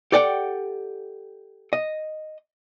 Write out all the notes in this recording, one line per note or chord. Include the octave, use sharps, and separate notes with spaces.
G4 A4 D5 F#5 G5
D#5